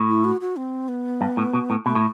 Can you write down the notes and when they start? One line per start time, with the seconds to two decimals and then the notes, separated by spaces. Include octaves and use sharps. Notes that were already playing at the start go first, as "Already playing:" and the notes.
Already playing: A2
0.08 E4
0.25 F#4
0.41 F#4
0.56 C4
0.88 B3
1.21 G2
1.37 A2
1.53 B2
1.70 A2
1.86 B2 A3
1.95 A2